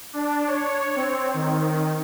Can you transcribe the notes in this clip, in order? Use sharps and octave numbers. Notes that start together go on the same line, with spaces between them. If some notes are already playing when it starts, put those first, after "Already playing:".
D4
C#5
C4
D#3